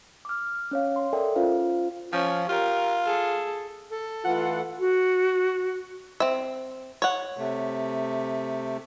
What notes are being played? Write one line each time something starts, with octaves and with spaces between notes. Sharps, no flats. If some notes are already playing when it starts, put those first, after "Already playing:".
D6 F6
C#4 C#5 F5
C6
A4 A#4 D5 E5 G5 G#5
C#4 F4 C5 F5
F3 C#4
F4 G4 A#4
G#4 A4
A4
E3 A3 F4 F#5
F#4
C4 E5
C#5 F#5
C3 A3